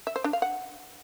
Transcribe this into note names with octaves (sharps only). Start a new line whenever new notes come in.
E5
C5
D4
F5
F#5